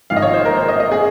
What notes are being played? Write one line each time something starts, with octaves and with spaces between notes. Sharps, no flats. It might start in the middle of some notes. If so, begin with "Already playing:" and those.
G#1 G#2 F3 F5
D#5
C#5
C5
A#4
C5
D#5
D#5
G#4